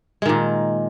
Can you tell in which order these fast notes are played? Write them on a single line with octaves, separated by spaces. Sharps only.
G#3 D#3 A#2